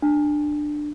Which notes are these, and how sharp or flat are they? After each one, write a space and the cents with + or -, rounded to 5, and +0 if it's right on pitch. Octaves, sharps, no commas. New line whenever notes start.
D4 +15